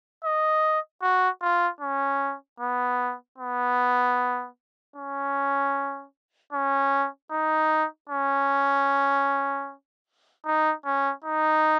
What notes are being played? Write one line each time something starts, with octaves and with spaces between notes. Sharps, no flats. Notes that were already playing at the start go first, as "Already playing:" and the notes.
D#5
F#4
F4
C#4
B3
B3
C#4
C#4
D#4
C#4
D#4
C#4
D#4